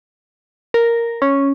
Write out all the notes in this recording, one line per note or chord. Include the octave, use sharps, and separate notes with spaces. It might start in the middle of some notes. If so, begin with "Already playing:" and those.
A#4
C#4